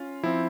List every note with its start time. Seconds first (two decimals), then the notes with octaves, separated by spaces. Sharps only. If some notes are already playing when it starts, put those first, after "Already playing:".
Already playing: C#4 F4
0.23 F3 C4 E4